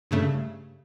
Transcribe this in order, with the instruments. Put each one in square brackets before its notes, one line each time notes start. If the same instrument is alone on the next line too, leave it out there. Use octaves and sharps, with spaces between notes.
[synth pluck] G2 C#3 A3